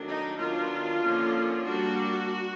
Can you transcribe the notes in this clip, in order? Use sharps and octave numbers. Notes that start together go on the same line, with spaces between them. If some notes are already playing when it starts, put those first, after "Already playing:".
Already playing: D#3 F#3 A3 D4
D#4
D#3 F#3 B3 D4 F4
D3 F3 A#3 C#4
G3 A#3 D4 F#4